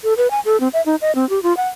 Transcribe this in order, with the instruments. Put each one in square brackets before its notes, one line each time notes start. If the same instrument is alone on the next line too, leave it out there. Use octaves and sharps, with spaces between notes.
[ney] A4
B4
G#5
A4
C4
E5
D#4
D#5
C4
G4
F4
F#5